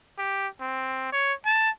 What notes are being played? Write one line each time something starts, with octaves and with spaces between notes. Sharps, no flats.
G4
C4
C#5
A5